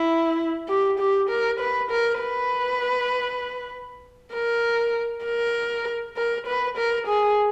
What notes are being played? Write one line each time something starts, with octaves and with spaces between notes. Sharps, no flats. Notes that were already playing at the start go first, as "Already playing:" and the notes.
Already playing: E4
G4
G4
A#4
B4
A#4
B4
A#4
A#4
A#4
B4
A#4
G#4